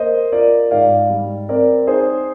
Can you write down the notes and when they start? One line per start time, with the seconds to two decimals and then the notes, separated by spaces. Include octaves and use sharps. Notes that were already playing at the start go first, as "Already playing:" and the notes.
Already playing: A#3 C5 D#5
0.32 F4 A#4 D5
0.71 G#2 D5 F5
1.10 G3
1.49 C4 A#4 D5
1.87 D#4 G#4 C5